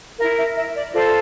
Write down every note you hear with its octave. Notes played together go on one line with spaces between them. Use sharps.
E4 A#4 F5
E5
E5
D5
F4 A4 C5 D5